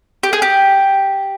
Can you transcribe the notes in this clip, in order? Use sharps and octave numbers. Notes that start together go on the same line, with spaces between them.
G4
G#4
G4